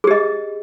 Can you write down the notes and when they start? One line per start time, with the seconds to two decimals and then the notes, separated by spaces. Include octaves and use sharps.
0.04 G#4
0.07 G4
0.11 D#5